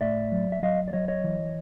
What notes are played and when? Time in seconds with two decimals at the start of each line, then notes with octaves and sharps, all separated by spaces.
0.01 A2 D5 E5
0.32 F#3
0.52 E5
0.63 F#3 D#5 F5
0.88 D5
0.93 F#3 C#5 D#5
1.08 C#5 D#5
1.24 E3